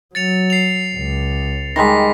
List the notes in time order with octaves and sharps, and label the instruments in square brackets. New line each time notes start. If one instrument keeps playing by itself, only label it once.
[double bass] F#3 [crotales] A6 C#7 F7
[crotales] C7 F7
[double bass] C#2
[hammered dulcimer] D#3 G3 G#3 [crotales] A#6 B6